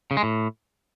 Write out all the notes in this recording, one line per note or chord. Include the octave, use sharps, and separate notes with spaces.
C#3
G#3
A2